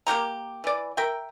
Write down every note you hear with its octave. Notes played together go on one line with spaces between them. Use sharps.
A#3 F#4 G4 A#5
E3 D5
A#4 E5 G5